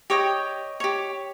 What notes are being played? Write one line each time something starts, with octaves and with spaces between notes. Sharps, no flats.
G4 C#5 D#5 G5
G4 C#5